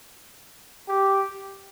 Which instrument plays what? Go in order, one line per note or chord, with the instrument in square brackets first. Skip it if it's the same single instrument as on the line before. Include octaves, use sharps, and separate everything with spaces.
[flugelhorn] G4